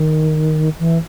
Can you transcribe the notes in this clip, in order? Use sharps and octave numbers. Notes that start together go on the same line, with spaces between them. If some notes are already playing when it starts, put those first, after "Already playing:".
Already playing: D#3
E3